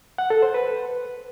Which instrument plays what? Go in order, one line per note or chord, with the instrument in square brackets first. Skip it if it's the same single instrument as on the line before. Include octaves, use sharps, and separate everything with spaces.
[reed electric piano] F#5
A4
C5
B4